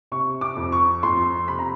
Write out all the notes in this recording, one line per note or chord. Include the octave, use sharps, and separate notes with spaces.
C3 C#6
D6
F2
C#6
F2 C6
C3 B5
A#5